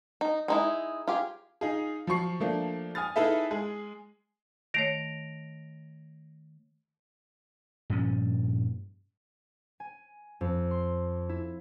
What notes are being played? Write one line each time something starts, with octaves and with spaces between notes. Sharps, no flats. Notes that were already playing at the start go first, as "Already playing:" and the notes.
D#4
G#3 D#4 E4
F4 G4 G#4
D#4 F4 G#4
F3 F#3 C#6 C7
F3 A3 A#3 D4
G#5 D#6 F6 A6
D#4 E4 G#4 A4 B4 E5
G#3 G#4
D#3 A3 C#5 A#6 D7 F7
G2 A#2 F3 C#4
G#5
F2
C6
E4